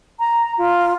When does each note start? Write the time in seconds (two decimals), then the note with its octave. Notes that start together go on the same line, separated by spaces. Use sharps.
0.20 A#5
0.58 F4